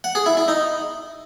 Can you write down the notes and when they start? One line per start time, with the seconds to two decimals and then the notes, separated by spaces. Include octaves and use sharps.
0.04 F#5
0.15 G#4
0.26 E4
0.37 E4
0.48 D#4